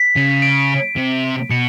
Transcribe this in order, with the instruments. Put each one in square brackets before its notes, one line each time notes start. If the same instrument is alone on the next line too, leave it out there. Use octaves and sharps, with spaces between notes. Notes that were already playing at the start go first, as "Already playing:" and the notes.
Already playing: [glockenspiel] B6
[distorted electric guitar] C#3
[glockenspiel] D7
[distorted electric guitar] C3
[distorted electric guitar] B2 [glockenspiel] C#7